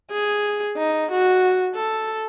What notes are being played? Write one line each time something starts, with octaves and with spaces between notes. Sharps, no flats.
G#4
D#4
F#4
A4